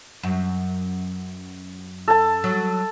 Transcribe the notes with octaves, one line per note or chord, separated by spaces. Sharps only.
F#2
A4 A5
F#3